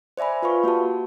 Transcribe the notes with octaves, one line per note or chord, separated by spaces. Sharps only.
C5 D5 E5 G#5 B5
F4 B4 F5 C#6
A#3 F#4 G4 A5